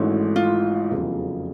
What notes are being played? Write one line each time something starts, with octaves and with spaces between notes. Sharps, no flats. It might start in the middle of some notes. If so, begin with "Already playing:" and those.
Already playing: G#1 G#2 E3 A3 C#4 F#4
F4
F1 E2 C#3 F#3